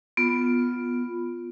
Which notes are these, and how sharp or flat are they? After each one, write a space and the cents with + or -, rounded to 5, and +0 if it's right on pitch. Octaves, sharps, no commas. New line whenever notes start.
B3 +0 F4 +0